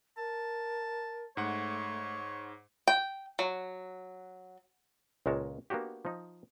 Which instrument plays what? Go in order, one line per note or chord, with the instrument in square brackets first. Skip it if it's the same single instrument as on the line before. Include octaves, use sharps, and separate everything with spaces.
[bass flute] A#4 [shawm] A5
[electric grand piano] G#2 F#5 [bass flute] A3 [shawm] C#5
[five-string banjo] G5
F#3
[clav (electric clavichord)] C#2 A#2 G#3 A#4 C#5 A5
A#3 B3 D4 F#4 G4
F3 D#4